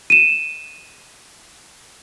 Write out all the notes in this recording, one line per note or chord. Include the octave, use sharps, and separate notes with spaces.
D#7 E7